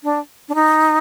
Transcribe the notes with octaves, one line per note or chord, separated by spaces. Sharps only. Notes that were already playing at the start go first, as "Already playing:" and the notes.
D4
D4
D#4